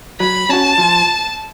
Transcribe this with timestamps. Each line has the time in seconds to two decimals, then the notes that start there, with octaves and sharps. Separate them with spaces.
0.20 F#3 B5
0.49 C#4 F#4 A5
0.78 F3